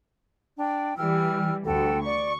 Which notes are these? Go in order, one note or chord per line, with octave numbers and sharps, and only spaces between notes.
D4 G5
E3 G3 G5 E6 F6
D2 F#4 A4 G5
D5 C#6